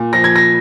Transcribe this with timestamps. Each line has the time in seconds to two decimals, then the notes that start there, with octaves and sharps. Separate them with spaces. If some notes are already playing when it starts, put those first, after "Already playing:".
Already playing: A#2
0.13 F3 A#6
0.24 G#6
0.36 A#6